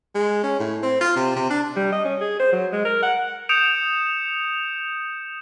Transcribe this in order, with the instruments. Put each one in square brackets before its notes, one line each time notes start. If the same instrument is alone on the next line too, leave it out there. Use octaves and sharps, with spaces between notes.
[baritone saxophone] G#3
C#4
A2
C4
F4
C3
C3
D4
[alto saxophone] G3
D#5
C#4
G#4
C5
F#3
G#3
A#4
F#5
[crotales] D#6 G6 C#7 D7 E7 F7